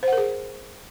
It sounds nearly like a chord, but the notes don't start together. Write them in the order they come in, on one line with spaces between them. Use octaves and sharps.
C5 F#5 A#4 G#4